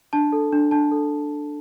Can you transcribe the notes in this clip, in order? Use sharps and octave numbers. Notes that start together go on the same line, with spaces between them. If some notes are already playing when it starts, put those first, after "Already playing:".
D4 A5
A4
D4
D4 A5
A4